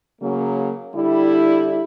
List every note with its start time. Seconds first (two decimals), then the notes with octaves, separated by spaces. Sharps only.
0.21 C#3 F#3 A#3
0.94 D3 G3 E4